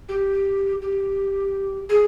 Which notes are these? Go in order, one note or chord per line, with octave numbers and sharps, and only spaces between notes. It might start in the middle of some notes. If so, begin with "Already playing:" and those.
G4
G4
G#4